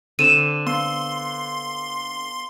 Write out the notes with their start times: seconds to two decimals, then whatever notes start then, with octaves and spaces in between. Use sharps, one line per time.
0.19 D3 C4 A4 D#7 E7
0.67 B3 C6